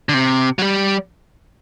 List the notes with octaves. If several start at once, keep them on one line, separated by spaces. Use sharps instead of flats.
D3
C3
F#3
G3